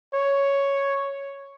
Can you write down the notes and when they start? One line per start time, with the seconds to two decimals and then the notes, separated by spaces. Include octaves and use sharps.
0.14 C#5